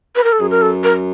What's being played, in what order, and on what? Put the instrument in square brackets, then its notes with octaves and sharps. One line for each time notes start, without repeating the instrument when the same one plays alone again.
[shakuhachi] B4
A#4
A4
[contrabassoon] F#2 [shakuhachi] G#4
[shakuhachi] A#4
A4
A#4